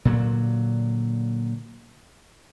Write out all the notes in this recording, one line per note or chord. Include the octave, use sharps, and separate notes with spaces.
A#2 D3 F#3